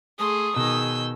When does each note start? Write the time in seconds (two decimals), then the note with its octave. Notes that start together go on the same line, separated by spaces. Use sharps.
0.19 A3 G#4 C6 D#6
0.56 B2 D#3 G#4 E6 G6